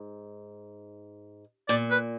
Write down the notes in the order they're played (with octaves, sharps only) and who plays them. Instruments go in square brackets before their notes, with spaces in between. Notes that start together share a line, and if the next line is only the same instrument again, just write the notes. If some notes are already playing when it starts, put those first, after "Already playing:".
Already playing: [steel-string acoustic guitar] G#2
[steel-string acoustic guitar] A#2 [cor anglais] D5
[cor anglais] B4